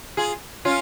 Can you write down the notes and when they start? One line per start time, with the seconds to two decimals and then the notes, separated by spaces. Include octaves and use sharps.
0.17 F4 G#4
0.65 C#4 F4